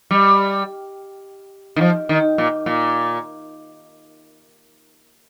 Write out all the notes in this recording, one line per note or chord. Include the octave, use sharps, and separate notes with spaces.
G3
D#3
F3
D#3
A#2
A#2